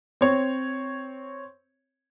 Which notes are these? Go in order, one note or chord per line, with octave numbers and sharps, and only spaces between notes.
C4 C#5